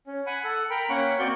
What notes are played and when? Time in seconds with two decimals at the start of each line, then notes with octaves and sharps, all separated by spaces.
0.07 C#4
0.27 F#5 G#5 B5
0.44 A4 F#5
0.70 A#4 G5 B5
0.90 A#3 C#4 F#5 G5 B5 C#6
1.19 A#3 C4 F#4 D5 C#6 G6